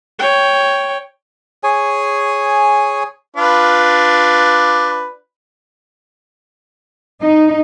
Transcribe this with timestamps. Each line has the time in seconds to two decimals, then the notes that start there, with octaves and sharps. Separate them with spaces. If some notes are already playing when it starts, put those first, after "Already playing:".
0.19 C#5 G5
1.64 G#4 C#5 G#5
3.37 D4 F4 B4
7.21 D#4